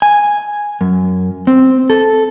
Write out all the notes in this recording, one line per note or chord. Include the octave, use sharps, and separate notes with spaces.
G#5
F#2
C4
A4